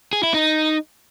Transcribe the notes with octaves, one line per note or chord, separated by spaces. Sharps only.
G#4
E4
D#4